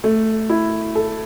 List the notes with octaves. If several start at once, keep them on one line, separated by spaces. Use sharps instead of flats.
A3
E4
A4